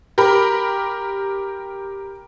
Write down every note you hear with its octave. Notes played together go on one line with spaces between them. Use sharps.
G4 A#4 B5